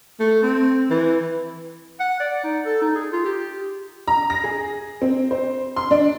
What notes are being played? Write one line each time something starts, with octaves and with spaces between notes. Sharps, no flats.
A3
C4
E3
F#5
D5
D#4
A4
D#4
G#4
F4
G4
A#5
A#6
G#4
C4
C5
C6
D4